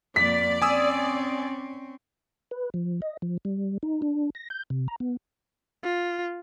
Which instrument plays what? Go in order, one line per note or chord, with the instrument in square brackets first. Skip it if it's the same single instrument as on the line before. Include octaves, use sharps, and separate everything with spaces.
[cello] F2 A#3 [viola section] D5 [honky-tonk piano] B6
[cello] C4 C#4 [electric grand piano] G#5 D#6 E6
[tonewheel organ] B4
F3
D#5
F3
G3
D#4
D4
A#6
G6
C3
A#5
B3
[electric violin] F4